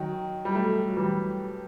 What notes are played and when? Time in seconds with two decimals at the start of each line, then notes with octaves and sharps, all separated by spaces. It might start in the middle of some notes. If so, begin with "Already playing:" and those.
Already playing: D#3 F#3
0.45 G3
0.55 F#3 A3
0.88 F#3
0.97 E3 G3